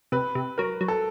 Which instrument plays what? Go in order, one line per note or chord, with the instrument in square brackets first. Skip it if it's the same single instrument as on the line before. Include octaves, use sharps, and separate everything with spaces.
[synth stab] C3 [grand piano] B4
[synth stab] C3
[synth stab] F#3 [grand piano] A#4
[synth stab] F#3
[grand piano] A4